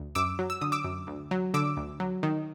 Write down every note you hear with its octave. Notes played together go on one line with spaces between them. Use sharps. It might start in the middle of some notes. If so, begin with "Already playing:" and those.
Already playing: D2
F#2 D6 E6
F#3
E6
D3 D#6
D6 E6
F#2
D2
F#3
D3 D6 E6
D2
F#3
D#3